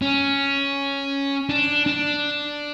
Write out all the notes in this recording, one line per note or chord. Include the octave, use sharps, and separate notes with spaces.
C#4
D4
D4